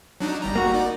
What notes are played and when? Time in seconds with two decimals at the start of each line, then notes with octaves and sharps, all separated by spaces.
0.20 F#3 D4 D#4
0.42 G1 G3 A#5
0.55 A#3 F#4
0.74 D#4 D5